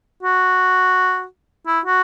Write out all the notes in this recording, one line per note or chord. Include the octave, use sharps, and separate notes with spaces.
F#4
E4
F#4